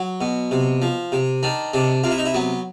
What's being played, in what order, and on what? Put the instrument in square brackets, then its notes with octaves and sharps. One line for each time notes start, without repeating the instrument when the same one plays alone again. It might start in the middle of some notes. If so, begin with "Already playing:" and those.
Already playing: [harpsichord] F#3
B2
C3
F3
C3
D#3 D4
C3 D4
C3 F4
E4
D#4
E4
F#3 B3